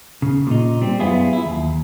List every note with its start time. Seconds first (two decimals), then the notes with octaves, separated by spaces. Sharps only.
0.22 C#3
0.47 A#2 D#4
0.81 G3 C4
1.00 F#2 B3 E4 F4 G#4
1.33 E4
1.46 D#2